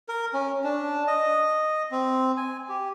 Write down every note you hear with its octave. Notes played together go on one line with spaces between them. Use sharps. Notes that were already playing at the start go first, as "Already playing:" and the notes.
A#4
C#4
D4
D#5
C4
G#5
G4